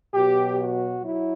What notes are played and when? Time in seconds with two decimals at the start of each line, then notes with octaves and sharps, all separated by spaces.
0.14 B2 F#3 G4
0.59 F#4
1.03 F#3 E4